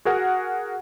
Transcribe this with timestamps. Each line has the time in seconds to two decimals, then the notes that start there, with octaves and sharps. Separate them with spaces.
0.05 F#4 G#4 A#4 F#5